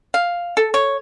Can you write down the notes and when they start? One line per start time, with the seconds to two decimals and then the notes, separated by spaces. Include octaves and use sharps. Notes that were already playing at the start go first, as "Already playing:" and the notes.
0.14 F5
0.57 A4
0.74 C#5